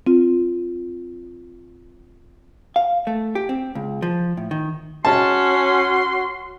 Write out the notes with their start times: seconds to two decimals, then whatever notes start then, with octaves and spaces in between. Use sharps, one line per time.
0.07 C4 F4
2.76 F5
3.07 A3
3.35 G4
3.49 C4
3.75 C#2
4.02 F3
4.37 A2
4.51 D#3
5.05 C#4 F#4 A5 C6